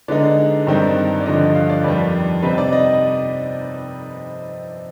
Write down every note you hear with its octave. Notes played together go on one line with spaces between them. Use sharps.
D3 G#3 B3 D#4 D5
G2 D#3 G3 C4 D#4
D5
G2 D3 F3 D#5
F5
D5
F2 D#3 G3 B4
C3 G3 C4 D#4 B4
D5
D#5